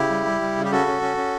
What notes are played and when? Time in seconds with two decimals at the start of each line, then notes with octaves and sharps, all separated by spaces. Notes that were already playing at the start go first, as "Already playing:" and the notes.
Already playing: C#3 E4 G4
0.10 G3
0.26 G3
0.41 G3
0.56 C#3
0.65 G4
0.71 C#4 F#4 A4
0.87 C#4
1.02 C#4
1.17 C#4